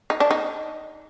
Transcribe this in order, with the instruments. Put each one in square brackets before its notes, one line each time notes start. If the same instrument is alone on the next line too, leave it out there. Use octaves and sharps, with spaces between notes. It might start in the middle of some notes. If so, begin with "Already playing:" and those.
[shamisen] D#4
D4
D#4